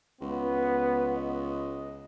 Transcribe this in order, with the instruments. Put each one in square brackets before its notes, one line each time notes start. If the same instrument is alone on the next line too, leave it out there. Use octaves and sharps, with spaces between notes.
[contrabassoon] C#2 [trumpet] B3
[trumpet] D#5